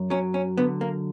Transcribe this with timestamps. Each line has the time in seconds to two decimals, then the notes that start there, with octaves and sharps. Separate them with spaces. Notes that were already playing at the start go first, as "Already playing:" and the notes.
Already playing: F#2
0.10 F#3 C#4
0.34 C#4
0.57 D3 B3
0.81 A#3